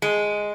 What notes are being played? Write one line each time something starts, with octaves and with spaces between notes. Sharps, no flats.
G#3